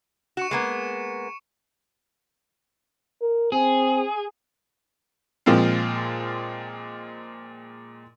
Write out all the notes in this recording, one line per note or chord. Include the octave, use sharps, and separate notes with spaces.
F#4 C#6 C#7 E7
G#3 A#3 B3
A#4
C4 G#4
A#2 F3 G#3 C4 F4